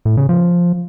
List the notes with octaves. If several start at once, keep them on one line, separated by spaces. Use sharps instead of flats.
A2
C#3
F3